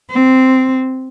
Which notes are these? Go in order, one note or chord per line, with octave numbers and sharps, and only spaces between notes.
C4